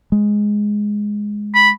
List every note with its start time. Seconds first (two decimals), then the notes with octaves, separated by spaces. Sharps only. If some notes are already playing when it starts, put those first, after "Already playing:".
0.12 G#3
1.55 B5